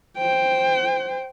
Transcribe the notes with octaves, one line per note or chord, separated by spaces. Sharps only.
C5 G5